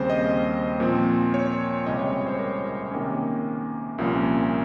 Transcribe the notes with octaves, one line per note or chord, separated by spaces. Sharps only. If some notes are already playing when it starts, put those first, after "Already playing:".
Already playing: D#2 C#3 G3 C4 C5
D#5
A#2 F3 C4
C#5
C#2 C3 G3 C#4 D#5
C#5
C#5
C5
A#4
C3 D#3 A#3 C#4
C2 A#2 F3 A#3 C#4